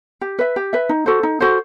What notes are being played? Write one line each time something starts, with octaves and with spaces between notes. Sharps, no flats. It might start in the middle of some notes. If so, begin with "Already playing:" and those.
G4
B4 E5
G4
B4 E5
D#4
F#4 A4 C5
D#4
F#4 A4 C5